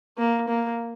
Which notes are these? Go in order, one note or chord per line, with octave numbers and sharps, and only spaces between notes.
A#3
A#3